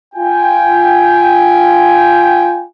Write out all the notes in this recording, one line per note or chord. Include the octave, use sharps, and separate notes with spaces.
F4 G5 G#5